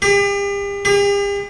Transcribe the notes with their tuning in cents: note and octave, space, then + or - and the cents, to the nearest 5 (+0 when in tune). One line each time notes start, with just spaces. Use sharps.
G4 +40
G4 +45